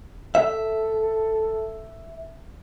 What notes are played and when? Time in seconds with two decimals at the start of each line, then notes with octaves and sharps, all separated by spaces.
0.35 A4 E5